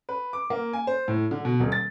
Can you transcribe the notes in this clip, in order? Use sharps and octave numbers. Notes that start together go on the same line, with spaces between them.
B4
D6
A#3
G#5
C5
A2
D3
B2
D#1
A6